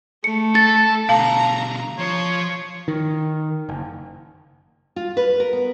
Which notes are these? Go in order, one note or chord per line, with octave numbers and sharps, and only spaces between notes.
A3 C#7
A4 A6
B2 D3 F5 A5 A#5
F3 C#5
D#3
F#1
F4
B4
A#4
B3